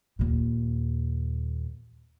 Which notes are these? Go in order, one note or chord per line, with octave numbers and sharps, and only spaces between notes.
D#2 A#2